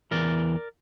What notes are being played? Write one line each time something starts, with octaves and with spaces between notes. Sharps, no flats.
E2 C3 E3 A#4 D5